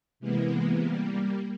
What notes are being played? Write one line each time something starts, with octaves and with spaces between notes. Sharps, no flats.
C3 E3 G#3 A#3 B3
G3 A#3